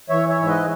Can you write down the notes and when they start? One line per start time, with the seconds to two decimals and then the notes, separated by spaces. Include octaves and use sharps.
0.09 E3 C#5 E5
0.29 C#5 E5
0.39 G#2 E5
0.48 B4 D#5